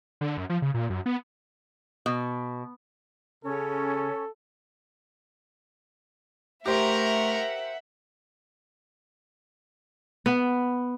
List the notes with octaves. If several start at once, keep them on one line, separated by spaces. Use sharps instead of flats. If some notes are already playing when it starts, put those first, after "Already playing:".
D3
F#2
F3
C#3
A#2
F#2
B3
B2
C#3 C#4 A4
A3 G4 A#4 C5 E5 F#5 A#5
B3